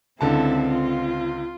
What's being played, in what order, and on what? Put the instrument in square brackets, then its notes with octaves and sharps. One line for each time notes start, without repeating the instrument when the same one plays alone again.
[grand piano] C#2 D3 A5 [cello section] C4 [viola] E4 A4
[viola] F4